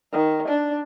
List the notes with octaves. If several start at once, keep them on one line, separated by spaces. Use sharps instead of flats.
D#3
D4